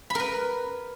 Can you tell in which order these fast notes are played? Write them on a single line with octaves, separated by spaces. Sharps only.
B5 A#4 B4